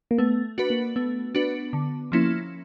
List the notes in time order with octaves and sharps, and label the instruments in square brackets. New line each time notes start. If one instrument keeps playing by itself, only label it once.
[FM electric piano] A#3
[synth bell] A3 [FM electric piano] B3
[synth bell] D4 F#4 B4
[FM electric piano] A#3
[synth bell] A3 [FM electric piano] B3
[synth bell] D4 F#4 B4
D3
F3 A#3 C#4 E4